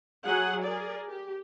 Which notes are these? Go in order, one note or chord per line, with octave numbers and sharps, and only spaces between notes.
F#3 G#4 F#5 G#5
G#4 A#4 D5
G4